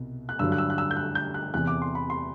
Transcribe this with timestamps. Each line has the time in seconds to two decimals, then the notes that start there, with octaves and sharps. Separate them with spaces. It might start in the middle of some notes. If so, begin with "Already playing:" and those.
Already playing: C2 B2
0.29 F#6
0.39 G2 D3 F#3 E6
0.52 F#6
0.58 E6
0.70 F#6
0.78 E6
0.91 G6
0.97 F#6
1.15 G6
1.34 F#6
1.53 E2 C3 E3 F#6
1.67 D6
1.82 C6
1.95 B5
2.10 C6